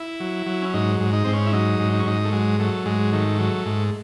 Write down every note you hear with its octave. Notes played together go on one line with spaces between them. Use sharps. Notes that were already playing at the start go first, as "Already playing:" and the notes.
Already playing: E4
F#3
F#3
C#4
G#2 D#4
G#2
D#4
G#2 C4
C#4
E4
F#3 D#4
G#2
D#4
C#4
G#2 D#4
A3
F#3 G#3
F#3 A3
G#2 G#3
D#3 A3
F#3
G#2